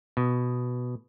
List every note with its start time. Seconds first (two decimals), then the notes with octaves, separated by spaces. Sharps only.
0.17 B2